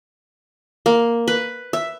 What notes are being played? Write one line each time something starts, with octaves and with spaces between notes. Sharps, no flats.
A#3
B4
E5